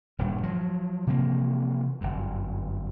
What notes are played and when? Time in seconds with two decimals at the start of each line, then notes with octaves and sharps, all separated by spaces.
0.19 D#1 D2 G2
0.43 F3 F#3
1.07 C3 E3 F3 A#3
2.01 G1 F#2